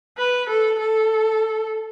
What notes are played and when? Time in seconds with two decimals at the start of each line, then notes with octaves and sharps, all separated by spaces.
0.18 B4
0.49 A4
0.80 A4